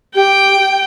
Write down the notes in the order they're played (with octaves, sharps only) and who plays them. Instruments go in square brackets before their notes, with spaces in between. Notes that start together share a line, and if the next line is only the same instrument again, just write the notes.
[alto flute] G4 [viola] G5